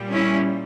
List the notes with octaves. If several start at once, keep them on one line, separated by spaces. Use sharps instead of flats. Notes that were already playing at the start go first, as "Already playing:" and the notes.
Already playing: A#2 G3
C#4 E4